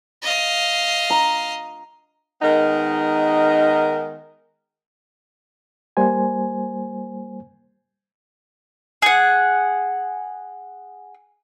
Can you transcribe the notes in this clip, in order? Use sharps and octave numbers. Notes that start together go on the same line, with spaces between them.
D#5 F5
A#5
D#3 G#3 B3 D#4 A#4
G3 A#3 C5 G#5
G#4 F#5